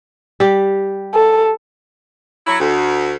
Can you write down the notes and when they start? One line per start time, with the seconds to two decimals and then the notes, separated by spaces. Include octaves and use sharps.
0.40 G3 G4
1.14 A4
2.46 F#3 E4
2.60 D2